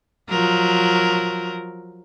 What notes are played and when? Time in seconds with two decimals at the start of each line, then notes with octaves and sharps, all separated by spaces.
0.29 F3 F#3 A#4